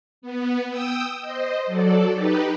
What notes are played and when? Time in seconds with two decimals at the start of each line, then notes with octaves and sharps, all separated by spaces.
0.22 B3
0.70 G5 D#6 E6
1.22 C5 D#5
1.66 F#3 A4 D5
2.14 D#4 G4 B4